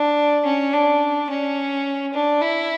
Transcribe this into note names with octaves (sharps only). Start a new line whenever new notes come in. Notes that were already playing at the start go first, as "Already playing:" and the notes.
Already playing: D4
C#4
D4
C#4
D4
E4